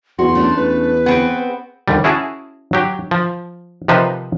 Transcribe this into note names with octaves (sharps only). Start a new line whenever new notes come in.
E2 F#4 C6
A3 C#4 D4
E2 B4
B3 C4 G#4 C#5
D#2 D3 G3
C#4 E4 F#4 G#4 A5
F#3 G4
F3
C3 D#3 F3 D#4 B4 C5